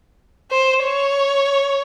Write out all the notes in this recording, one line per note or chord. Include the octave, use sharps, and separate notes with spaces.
C5
C#5